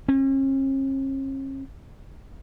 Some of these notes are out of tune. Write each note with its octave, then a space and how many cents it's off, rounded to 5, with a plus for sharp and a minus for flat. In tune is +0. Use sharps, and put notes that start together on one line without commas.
C#4 -45